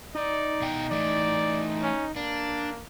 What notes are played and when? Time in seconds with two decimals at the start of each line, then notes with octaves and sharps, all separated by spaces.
0.15 D#4 D5
0.62 B2 F5 G5
0.91 E3 A3 D5
1.82 C#4
2.16 A#3 D4